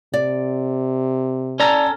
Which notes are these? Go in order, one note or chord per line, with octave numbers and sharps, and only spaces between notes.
C3 D5
C#4 A4 D5 A#5